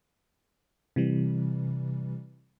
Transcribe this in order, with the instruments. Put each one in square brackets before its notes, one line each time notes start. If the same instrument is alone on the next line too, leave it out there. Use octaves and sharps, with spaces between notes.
[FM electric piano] C3 E3 G3